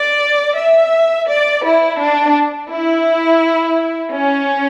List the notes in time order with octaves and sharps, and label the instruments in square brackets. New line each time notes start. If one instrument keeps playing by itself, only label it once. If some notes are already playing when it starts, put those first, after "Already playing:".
Already playing: [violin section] D5
E5
D5
E4
D4
E4
C#4